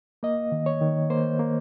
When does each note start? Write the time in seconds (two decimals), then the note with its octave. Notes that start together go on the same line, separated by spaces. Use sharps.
0.23 A#3 D#5
0.52 D#3
0.66 C#5
0.81 D#3
1.10 A#3 C5
1.39 A#3